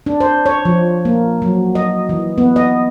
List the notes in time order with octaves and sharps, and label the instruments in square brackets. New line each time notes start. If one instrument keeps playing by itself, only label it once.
[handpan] D4
C5
C#5
F3
A#3
F#3
D#5
E3
B3
D#5